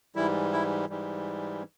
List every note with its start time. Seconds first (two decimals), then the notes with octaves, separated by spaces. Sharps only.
0.16 G#2 E3 G3 E4
0.52 E4
0.89 G#2 E3 G3